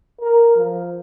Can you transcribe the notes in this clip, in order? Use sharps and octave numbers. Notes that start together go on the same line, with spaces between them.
A#4
F3